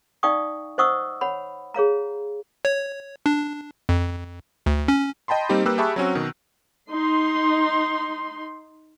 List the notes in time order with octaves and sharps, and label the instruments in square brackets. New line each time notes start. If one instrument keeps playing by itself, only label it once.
[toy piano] D#4 D5 F5 G5 C#6 D#6
C5 D#5 F#5 C#6 D#6 E6
C#5 F#5 B5
G#4 C#5 F5 A#5
[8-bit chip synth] C#5
D4
F2
D2
C#4
[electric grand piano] D#5 G5 A5 B5 C6
G3 A#3 C4 D#4 G4
G3 A#3 G4 B4 E6 F#6
G4 G#4 E5 A5 B5 C#6
F#3 C4 C#4 F#4
B2 D#3
[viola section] D#4 C6